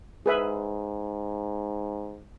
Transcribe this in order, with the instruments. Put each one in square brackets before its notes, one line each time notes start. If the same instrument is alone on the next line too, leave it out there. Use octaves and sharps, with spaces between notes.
[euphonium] G#2 [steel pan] G#4 B4 E5